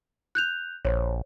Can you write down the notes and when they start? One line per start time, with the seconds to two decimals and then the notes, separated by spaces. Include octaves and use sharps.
0.35 F#6 G6 F7
0.85 A#1 C5 C#5